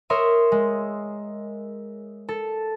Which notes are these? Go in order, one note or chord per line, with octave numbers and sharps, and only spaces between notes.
A#4 C#5 E5 C6 D#6
G#3
A4